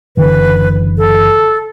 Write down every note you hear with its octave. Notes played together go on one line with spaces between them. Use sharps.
F#1 D3 E3 B4
A4